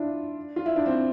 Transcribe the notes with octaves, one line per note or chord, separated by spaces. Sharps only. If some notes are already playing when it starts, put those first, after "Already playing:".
Already playing: D4 E4 F4
F4
E4
D4
C4